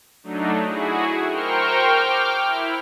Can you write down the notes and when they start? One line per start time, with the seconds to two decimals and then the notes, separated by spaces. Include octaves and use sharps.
0.24 F#3 A3 D4 D#4
0.67 E4 F#4 G#4
1.28 A#4 C5 G5 C#6 F6
1.86 G5 D6 F6
2.44 E4